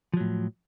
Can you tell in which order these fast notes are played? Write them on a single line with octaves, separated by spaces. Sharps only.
F3 F#3 A2